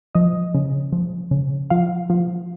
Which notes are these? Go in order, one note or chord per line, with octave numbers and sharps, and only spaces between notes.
F3 D#5
C#3
F3
C#3
F3 F5
F3